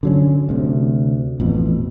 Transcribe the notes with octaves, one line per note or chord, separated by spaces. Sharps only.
D3 F#3 C#4
D2 C3
A1 F2 B2